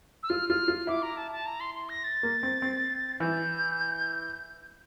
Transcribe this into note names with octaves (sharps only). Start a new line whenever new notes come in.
E6
F4 F6
F4 F6
F4
E4 D6
A#5
A5
A5
A#5
C6
C6
A#6
A6
A#3
C4
C4
E3 G6